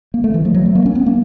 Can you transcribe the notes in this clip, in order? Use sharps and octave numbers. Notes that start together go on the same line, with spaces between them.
A#3
A3
E3
F3
F#3
A3
A#3
C#4
B3
A#3